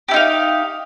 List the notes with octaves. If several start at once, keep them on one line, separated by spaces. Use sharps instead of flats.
D#4 E4 G4 F5